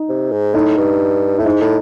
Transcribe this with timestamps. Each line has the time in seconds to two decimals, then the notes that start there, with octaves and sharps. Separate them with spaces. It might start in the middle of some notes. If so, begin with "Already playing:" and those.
Already playing: D#4
0.09 C3
0.32 G#2
0.54 A2 D#4
0.77 G2
1.38 A2 E4
1.45 G#2 D#4
1.61 A2